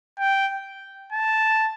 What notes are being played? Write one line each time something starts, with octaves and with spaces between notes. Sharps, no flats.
G5
A5